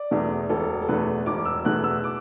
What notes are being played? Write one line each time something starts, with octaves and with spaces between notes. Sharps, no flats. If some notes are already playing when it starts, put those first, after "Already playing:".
Already playing: D5
E2 B2 A3
E1 A4
A4
E2 B2 A3 B4
E1 D6
E6
E2 B2 A3 F#6
E6
D6